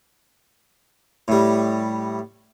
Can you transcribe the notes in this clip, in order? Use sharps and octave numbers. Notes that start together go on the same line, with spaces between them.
A2 G3